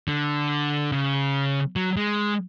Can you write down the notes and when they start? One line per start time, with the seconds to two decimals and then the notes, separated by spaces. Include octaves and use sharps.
0.08 D3
0.92 C#3
1.76 F#3
1.97 G#3